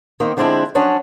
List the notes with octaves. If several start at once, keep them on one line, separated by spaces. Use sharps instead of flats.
D#3 A#3 C4
D3 F3 G#3 C4 D4 E4
F3 F#3 C#4 D4